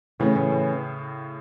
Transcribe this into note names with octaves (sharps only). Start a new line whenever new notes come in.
A2 C#3 E3 A3 C#4
A2 C#3
A2